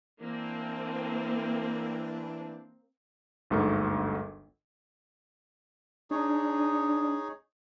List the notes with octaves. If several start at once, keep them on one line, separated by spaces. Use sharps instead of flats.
E3 A#3 C4 D4
G1 D2 G#2 A4 A#4 C#6
D4 D#4 G#4 C#5